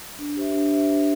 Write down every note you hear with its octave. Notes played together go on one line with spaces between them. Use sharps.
D4
G4 C5 E5
D4
G4 C5 E5
D4